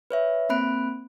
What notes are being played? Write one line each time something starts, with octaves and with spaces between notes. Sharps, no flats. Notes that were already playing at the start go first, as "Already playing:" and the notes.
B4 C#5 E5
A#3 C4 B5 F#6 D7